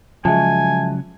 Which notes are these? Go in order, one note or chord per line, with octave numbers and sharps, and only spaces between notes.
C#3 F3 F#3 G#3 E5 G#5 A5